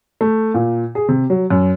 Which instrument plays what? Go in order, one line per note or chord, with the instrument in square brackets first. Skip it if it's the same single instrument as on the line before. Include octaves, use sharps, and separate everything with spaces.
[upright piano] A3
A#2
G#4
C3
F#3
F#2